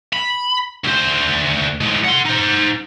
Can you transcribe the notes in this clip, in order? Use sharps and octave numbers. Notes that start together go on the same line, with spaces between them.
B5
D2 C5
A2 G#3
F#5 C6
D#4 C5